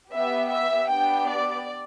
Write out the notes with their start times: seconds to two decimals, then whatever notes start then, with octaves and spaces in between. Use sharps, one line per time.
0.13 B3 G4 E5
0.52 E5
0.91 B3 D4 G4 G5
1.30 D5